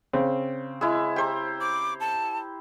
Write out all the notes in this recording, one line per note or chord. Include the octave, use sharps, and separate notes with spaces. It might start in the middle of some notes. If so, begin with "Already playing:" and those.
C#3 C4
G#3 E4
G4 C5 A#5
D6
A5